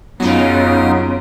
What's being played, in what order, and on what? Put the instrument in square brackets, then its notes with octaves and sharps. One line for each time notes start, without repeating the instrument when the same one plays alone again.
[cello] F#2 C#3 [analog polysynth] F#3 D#4 F4 [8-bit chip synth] B3